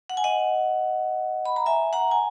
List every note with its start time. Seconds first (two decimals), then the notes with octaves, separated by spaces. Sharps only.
0.10 F#5
0.17 G#5
0.24 D#5 F#5
1.46 B5
1.56 A#5
1.66 E5 G#5
1.93 F#5 A#5
2.11 G#5